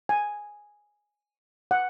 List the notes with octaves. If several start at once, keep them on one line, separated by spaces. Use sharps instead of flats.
G#5
F#5